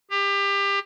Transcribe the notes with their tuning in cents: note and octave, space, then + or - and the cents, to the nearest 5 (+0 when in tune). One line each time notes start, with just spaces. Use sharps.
G4 +25